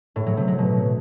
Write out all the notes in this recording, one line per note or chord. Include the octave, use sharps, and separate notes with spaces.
A2
F#3
C3
F#3
B2